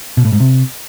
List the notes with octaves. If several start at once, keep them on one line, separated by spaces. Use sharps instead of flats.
B2
A2
G#2
C3